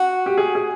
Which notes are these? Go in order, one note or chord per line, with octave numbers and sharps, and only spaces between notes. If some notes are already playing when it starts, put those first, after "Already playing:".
Already playing: F#4
G4
G#4
G#4